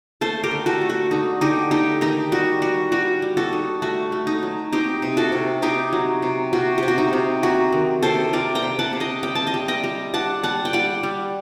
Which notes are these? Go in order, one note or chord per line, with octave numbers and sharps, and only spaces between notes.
A3 A4 C5
G4 A#4
D3
F#4 A4
A3
F#4
D3 D#4
D3 D#4 G4
A3 D#4 G4
D#3 D#4 G4
G3 F#4
G3 F#4
G3 F#4
G3
F#4 A4
D#4
A3 F#4
A3
D#4
F#3
C4 D#4 G4
C3
F#4 A4
C3
C3 D#4 G4
F#3
C3
C3 F#4
C3 G4
F#4
D#4
C3
F#3 F#4
D#3
C3 A4 C5
C3 A#4 D5
G5 A#5
C3
F#5 A5
C3
D#5 G5
G3 G5
A5
D#5 G5
G3
D#5 G5
G3
D4 F#5 A5
G3 F#5 A5
G5
G3 D5 F#5
G3